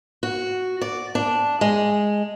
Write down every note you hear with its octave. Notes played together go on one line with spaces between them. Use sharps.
F#4
D5
D4
G#3